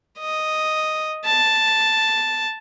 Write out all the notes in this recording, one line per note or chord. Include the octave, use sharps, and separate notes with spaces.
D#5
A5